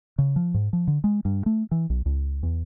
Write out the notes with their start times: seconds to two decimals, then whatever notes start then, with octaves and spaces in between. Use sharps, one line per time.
0.18 C#3
0.36 F3
0.54 G#2
0.73 F3
0.87 D3
1.04 G#3
1.25 G2
1.46 A3
1.71 E3
1.90 B1
2.06 C#2
2.43 E2